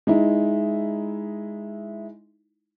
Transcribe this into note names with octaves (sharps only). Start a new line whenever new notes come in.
G#3 D#4 E4